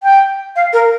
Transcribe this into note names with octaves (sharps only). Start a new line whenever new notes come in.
G5
F5
A#4